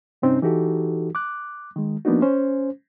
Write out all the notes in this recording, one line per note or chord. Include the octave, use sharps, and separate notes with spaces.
G2 C3 C4 C#4 D#4
E3 D#4 F#4 G4 A4
D6 F#6
D#3 G#3
F3 A#3 B3 D4 D#4 F#4
C#4 C5